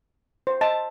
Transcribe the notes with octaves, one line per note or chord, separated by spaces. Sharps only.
C5
D#5 A5